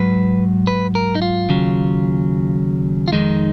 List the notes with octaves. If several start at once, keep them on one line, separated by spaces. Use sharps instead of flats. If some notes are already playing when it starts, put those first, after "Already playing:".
Already playing: G#2 F#3 B4
B4
A#4
D#4
F4
D#2 C#3 F#3
F4
F2 D#3 G#3 D#4